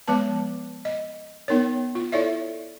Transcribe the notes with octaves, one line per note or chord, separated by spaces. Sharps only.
F3 G#3 B3 B4 A5
D#5
B3 D#4 A#4 C#5
F4
E4 A4 C#5 D5 E5